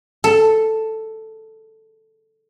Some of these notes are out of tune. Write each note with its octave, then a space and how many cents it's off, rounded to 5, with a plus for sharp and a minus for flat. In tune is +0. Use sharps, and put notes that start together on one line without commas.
A4 +5